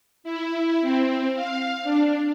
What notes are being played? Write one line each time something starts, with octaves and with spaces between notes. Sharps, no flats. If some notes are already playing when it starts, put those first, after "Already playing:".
E4
C4
F5
D4